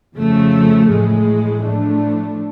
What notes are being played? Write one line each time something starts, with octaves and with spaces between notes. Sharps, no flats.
F2 C#3 F3 A3
A1 A2 G#3
A2 F3 A3 D4